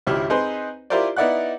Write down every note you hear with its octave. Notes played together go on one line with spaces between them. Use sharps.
G#1 C#2 E4 G4 E5 F6
C4 D#4 G#4 B4 C5
E4 F4 G4 A#4 C5 D5
B3 D#4 E4 D5 F#5 F#6